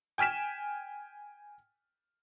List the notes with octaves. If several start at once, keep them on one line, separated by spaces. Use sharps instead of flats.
G5 G#5 F6 B6 E7